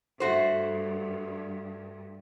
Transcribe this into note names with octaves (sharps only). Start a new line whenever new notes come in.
G2 A3 F#4 C5